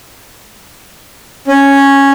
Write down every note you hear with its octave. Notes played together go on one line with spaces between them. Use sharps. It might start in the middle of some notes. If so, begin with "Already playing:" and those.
C#4